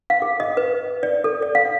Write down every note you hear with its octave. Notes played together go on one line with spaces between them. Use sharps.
F5
G#4
D#5
B4
D5
A4
D5
F5